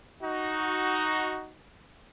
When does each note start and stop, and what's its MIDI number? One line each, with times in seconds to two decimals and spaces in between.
0.21 1.53 63
0.21 1.53 66